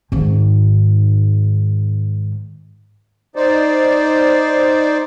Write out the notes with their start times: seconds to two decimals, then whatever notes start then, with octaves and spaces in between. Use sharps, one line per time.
0.12 G#2 D#3
3.36 D#4 C5 D5